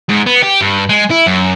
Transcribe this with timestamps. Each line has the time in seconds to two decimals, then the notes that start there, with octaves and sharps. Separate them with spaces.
0.09 G#2
0.26 B3
0.42 G4
0.61 G2
0.89 G#3
1.10 E4
1.27 F#2